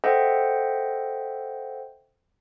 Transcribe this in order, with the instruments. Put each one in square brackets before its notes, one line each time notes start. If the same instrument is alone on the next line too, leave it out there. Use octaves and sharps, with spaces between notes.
[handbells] A4 C5 D#5 E5 F#5 G5